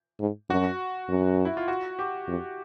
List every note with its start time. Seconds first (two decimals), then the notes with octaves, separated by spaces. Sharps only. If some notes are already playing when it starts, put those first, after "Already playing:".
0.20 G#2
0.50 F#2 F#4
1.09 F#2
1.45 E4
1.57 F4
1.68 F#4
1.99 G4
2.28 F2